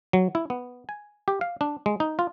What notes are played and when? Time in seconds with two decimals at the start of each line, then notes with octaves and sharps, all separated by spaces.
0.13 F#3
0.35 E4
0.50 B3
0.89 G#5
1.28 G4
1.41 F5
1.61 D4
1.86 G#3
2.00 D#4
2.19 F4